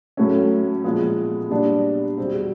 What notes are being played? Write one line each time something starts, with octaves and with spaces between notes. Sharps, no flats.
A2 F#3 A3 C#4
A#2 F3 G#3 B3
A#2 G3 B3 D4
E2 B2 G3 C4